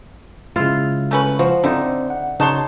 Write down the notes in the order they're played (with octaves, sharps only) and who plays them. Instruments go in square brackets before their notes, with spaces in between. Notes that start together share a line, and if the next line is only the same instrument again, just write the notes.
[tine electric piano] C#3 G#3 [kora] E4 F4
[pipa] A3 C#4 B4
[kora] F3 [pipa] F#4
[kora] D3 D#4 [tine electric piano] C4 C5 [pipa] E4
[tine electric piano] F#5
[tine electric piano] C#3 [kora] D#4 C#5 [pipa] F#4 A5 C6